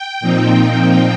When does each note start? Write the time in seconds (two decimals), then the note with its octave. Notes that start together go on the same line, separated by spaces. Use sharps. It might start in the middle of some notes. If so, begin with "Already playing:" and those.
Already playing: G5
0.21 A#2 F3 C4 D#4